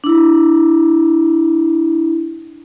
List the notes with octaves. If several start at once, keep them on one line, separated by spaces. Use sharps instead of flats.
D4 E4